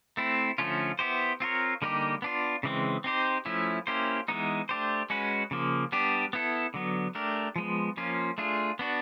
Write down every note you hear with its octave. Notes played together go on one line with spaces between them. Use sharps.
A3 C4 E4
D3 F3 A3 C#4 F4
B3 E4 G4 C5
C4 F4 A#4 C#5
D3 G3 A#3 D#4 G4
B3 D4 F4
C#3 E3 G#3 C4
C4 D#4 G4 C5
F3 A3 C#4 E4
A#3 C#4 E4 G4 C5
E3 G#3 B3 D#4
A3 D4 G4 C5
G#3 C#4 F#4 B4
C#3 F3 A#3
G3 B3 D4 G4
B3 E4 A4
D3 F#3 B3
A3 D4 G4 A#4
F3 G#3 B3
F3 A#3 C#4 F4
A3 D4 F4 G#4
B3 D4 F#4